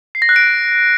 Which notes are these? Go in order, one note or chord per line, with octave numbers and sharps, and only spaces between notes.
C7
A#6
F#6
D7